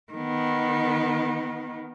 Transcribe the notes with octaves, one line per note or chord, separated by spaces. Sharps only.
D#3 B3